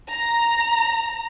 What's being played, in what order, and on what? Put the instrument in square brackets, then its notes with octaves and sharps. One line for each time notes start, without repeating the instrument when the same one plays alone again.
[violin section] A#5